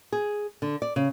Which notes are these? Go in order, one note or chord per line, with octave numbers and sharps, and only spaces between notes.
G#4
D3
D5
C#3